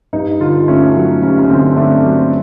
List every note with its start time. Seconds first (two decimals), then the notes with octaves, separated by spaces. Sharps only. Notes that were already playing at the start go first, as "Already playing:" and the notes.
0.13 G2 D#4
0.40 D3 F4
0.68 A3 C#4
0.95 F#3
1.22 G2 C#4
1.39 C#4
1.50 D3 C4
1.76 A3 D4
2.04 F#3
2.18 C4